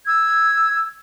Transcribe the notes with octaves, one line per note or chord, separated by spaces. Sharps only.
E6 G#6